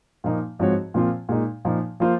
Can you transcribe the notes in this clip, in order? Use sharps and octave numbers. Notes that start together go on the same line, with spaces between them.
A#2 F3 A#3 D#4
G#2 F3 C4 F#4 C#5
A#2 F3 C4 F4
A#2 G#3 D#4
A#2 F3 A#3 D#4
F3 A#3 F4 C5